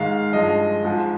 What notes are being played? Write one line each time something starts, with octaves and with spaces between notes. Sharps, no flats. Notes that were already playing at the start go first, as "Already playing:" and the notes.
Already playing: G#2 D#3 G#3 F5
G2 F3 G#3 D#5
G#2 F3 G#3